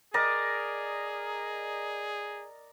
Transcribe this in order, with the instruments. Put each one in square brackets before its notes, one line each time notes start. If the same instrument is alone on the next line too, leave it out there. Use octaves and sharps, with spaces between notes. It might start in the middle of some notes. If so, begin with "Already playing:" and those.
[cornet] G#4 [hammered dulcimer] A#4 D5 D#5